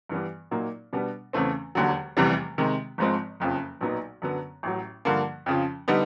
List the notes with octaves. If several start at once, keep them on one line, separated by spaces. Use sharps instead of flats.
G2 E3 G3 B3
A#2 F#3 A#3 D#4
B2 G3 B3 D4
E2 C#3 E3 A3 C4
E1 D#2 D3 F#3
F1 E2 C3 E3 G3
C3 D#3 G#3
G#1 G#2 F3 G#3 C4
F#1 F2 C#3 F3
B1 A#2 F#3 B3 D#4
F#2 D3 F#3 B3
A1 A2 F#3
G2 D3 F3 A#3
F2 C#3 F3
D3 G3 B3 D#4